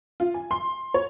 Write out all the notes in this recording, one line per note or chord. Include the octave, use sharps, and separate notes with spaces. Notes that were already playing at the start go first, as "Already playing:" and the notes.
F4
G#5
C6
C#5